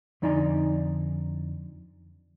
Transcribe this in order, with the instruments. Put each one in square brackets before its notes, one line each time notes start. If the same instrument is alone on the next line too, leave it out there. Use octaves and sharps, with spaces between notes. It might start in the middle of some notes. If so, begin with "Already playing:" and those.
[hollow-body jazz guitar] F2 D3 D#4 D5 G#5 A#5